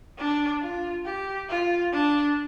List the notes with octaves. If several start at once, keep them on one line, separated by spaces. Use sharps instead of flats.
D4
F4
G4
F4
D4